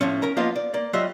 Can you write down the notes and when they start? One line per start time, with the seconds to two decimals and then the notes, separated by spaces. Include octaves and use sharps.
0.01 A2 F3 C#4
0.22 C#4 A#4 A#5
0.37 F3 A#3 B3 F4 D#5 F5
0.56 D5
0.74 A#3 D5
0.93 F#3 G3 F4 D#5 E5